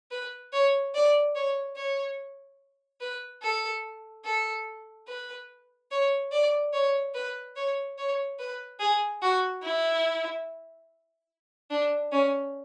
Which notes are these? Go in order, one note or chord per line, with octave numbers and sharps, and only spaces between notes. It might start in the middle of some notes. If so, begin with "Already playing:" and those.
B4
C#5
D5
C#5
C#5
B4
A4
A4
B4
C#5
D5
C#5
B4
C#5
C#5
B4
G#4
F#4
E4
D4
C#4